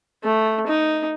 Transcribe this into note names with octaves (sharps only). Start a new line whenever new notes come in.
A3
D#4